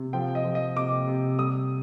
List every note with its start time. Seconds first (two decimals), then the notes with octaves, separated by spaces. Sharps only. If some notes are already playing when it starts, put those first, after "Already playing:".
Already playing: C3
0.13 F3 G5
0.35 D#5
0.45 F3
0.55 D#5
0.76 C3 D6
1.07 C3
1.39 G3 D#6